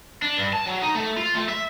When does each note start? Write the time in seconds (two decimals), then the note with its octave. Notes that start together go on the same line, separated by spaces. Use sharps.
0.22 D4
0.37 G2
0.53 A5
0.66 F#3
0.82 D#4
0.95 A3
1.17 F4
1.35 A3
1.49 E5